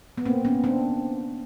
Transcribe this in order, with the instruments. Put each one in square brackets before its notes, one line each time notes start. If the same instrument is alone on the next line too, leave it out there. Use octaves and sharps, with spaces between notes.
[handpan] B3
A#3 C4
B3 C#4
C4 D4